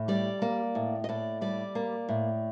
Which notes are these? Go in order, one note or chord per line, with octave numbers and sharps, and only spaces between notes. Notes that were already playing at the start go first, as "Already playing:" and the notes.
Already playing: A2
G3 D5
A#3
A2
D#5
A2 D5
G3 D5
A#3
A2